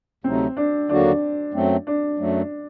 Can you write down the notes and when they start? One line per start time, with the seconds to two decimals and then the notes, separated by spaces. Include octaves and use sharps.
0.24 D2 C3 F#3 A3 C4 D#4
0.57 D4
0.89 D#2 D3 F#3 A#3 D4 F#4
1.54 F#2 F#3 A3 C4
1.87 D4
2.19 F#2 F#3 A3